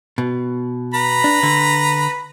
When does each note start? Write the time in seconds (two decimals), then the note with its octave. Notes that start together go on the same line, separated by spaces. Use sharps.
0.18 B2
0.94 B4 A#5 B5
1.24 D4
1.43 D3